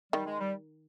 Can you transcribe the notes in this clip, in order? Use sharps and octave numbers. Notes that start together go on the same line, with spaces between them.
D#3 G3
G#3
G3